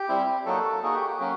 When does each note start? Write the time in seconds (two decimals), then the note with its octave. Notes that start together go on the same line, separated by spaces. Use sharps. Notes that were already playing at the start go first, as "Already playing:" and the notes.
Already playing: G4
0.09 G3 C4 E4
0.46 F#3 A#3 D#4 F#4 A4
0.83 A#3 D#4 F#4 G#4
0.95 G4
1.08 F#4
1.20 F#3 A#3 C#4 F#4